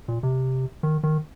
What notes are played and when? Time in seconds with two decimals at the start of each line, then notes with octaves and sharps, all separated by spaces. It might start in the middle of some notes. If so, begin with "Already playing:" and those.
0.08 A#2
0.23 C3
0.83 D#3
1.03 D#3